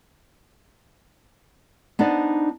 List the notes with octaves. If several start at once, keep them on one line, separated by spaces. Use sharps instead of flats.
B3 D4 D#4 C5 D5